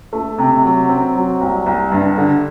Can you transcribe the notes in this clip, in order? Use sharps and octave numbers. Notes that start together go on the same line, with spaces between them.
A3
C3
F#3
C4
F#3
C2
C2
G2
D3